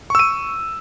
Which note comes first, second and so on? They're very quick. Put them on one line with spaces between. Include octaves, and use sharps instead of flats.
C#6 E6 D#7